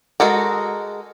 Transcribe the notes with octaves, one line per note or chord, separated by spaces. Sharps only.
G#3 F#4 A4 A#4